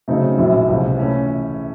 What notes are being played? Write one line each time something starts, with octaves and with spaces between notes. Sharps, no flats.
C#3 F#3 A3 C4 D#4
A#1 A2 F#3
C#2 C3 F3
E3 A3 C#4 E4